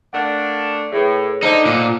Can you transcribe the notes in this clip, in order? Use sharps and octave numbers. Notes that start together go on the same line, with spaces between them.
A3 A#3 D4 F#5
A2 G#4 B4
D3 D#4 C5 A5 G7
A#2